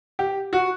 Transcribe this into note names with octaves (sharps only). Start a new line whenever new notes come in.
G4
F#4